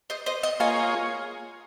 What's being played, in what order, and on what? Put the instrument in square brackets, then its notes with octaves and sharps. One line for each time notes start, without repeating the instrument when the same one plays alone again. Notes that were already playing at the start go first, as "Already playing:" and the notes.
[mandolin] C5 D#5
C5 D#5
D#5 G5
[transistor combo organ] A#3 F4 G#4 C#5 [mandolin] F5 G#5